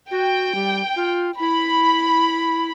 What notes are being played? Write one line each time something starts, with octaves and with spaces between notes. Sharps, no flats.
F#4 G5
G3
F4
E4 B5